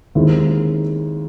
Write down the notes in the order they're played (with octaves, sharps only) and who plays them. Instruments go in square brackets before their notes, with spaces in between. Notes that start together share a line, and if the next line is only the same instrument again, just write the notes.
[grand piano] D#2 D#3 G#3 C4 E4